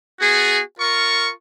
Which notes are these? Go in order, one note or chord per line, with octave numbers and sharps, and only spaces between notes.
B3 F#4 G#4
F4 A#4 C#6